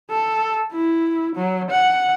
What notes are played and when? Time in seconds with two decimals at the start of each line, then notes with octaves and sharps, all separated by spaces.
0.10 A4
0.72 E4
1.36 F#3
1.71 F#5